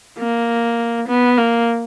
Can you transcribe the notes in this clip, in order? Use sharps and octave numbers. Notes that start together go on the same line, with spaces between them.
A#3
B3
A#3